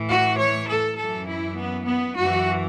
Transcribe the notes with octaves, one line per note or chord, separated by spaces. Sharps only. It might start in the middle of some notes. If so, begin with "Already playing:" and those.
Already playing: A2 E3
F#4
C#5
A4
F#2 E3 A4
E4
B3
B3
F#2 E3 F#4